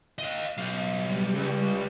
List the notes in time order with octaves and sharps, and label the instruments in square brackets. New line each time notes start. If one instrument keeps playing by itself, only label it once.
[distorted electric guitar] D#5 F5
B1 F5
[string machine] G3
[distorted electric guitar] C#2